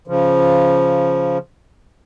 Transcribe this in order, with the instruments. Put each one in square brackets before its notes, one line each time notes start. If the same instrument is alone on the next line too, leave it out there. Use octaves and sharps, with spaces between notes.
[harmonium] C#3 F3